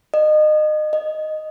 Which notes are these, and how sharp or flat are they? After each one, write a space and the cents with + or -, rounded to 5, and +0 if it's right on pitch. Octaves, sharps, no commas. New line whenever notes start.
D#5 -30
D#5 -5